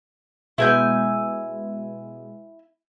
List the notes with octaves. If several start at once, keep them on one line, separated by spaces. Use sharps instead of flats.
B2 G#3 B3 E4 G#5 G6